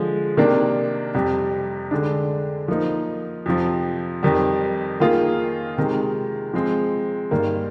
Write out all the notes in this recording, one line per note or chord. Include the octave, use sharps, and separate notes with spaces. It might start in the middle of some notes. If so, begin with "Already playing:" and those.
Already playing: D3 F3 G#3
C3 D#3 A#3 D4
F2 C3 G3
D3 G#3 D4
F3 A#3 D#4
F2 C3 F3
F2 D#3 G3
D#3 A#3 F4 G#4
C3 D#3 G#3
F3 G#3 C4
G2 D#3 A#3